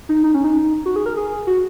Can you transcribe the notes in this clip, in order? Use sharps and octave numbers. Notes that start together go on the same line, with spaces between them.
D#4
D#4
C#4
D#4
F#4
G#4
A#4
G#4
F#4